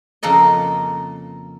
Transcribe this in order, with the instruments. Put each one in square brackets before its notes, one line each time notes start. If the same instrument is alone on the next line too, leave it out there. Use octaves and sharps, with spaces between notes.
[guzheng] F2 C#3 A#3 A4 D#5